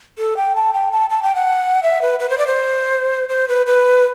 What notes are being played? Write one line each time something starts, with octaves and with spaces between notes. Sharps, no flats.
A4
G5
A5
G5
A5
A5
G5
F#5
E5
B4
B4
C5
D5
C5
C5
B4
B4